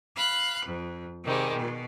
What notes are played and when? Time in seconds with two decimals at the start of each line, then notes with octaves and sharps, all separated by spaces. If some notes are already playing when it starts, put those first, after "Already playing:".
0.16 F5 B5 F#6
0.65 F2
1.24 C3 D#3 G3 G#3
1.54 B2